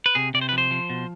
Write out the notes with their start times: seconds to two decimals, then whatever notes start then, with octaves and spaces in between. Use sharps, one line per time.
0.06 B4
0.15 C3 G#4
0.34 C3 D5
0.41 C5
0.49 B4
0.52 F3
0.58 C5
0.71 F3
0.90 B2